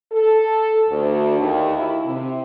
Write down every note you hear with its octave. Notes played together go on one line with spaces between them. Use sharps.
A4
D2
D#2
E4
C3